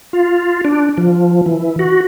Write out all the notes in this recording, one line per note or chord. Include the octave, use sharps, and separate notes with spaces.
F4
D4
F3
E3
F#4